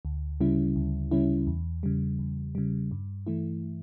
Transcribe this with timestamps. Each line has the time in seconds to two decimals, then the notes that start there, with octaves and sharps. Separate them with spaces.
0.05 D2
0.41 C#3 G3 C#4 E4
0.76 D2
1.11 C#3 G3 C#4 E4
1.47 E2
1.83 C#3 G3
2.19 E2
2.55 C#3 G3
2.91 G2
3.27 E3 A3 E4